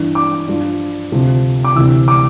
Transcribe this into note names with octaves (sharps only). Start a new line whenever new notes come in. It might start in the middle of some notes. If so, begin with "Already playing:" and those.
Already playing: G2 E3
D6
G2 F3
D2 C3 F3
D6
D2 C3 E3 E6
D6